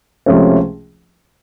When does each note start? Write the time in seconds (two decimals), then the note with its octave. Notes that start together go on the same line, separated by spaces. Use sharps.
0.26 C#2 C3 F3 A3 C#4